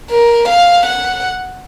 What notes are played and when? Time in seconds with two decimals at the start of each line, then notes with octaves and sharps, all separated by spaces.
0.11 A#4
0.49 F5
0.86 F#5